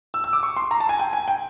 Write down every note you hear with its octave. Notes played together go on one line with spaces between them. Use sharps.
E6
E6
D6
C#6
C6
A#5
A5
G#5
G5
G#5
G5